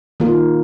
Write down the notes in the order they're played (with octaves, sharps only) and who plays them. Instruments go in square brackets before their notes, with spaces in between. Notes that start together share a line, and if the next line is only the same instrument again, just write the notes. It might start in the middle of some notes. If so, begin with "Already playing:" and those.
[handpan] D#3 A#3 F4 A#4